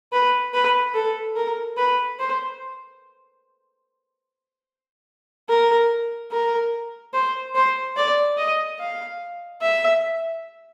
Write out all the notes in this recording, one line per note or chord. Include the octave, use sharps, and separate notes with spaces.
B4
B4
A4
A#4
B4
C5
A#4
A#4
C5
C5
D5
D#5
F5
E5